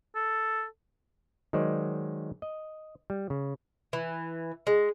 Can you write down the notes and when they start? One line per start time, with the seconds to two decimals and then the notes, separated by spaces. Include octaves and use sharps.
0.16 A4
1.53 D#3 F#3 G#3 C5 D5
2.42 D#5
3.10 G3
3.30 C#3
3.93 E3
4.67 G#3